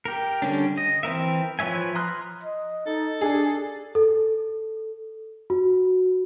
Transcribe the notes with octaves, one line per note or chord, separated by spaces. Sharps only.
G4 A#4
D3 G3 C#4 D4
D#5
E3 C4 A#4 E5
F3 B4 C#5 E5 G#5
A#5 C6 D#6 F6 F#6
D#5
D#4 A4
D4 G#4
A4
F#4